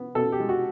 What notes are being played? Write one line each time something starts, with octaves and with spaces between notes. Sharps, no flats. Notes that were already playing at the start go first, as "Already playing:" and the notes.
Already playing: B3
B2 A4
G4
G#3
F#4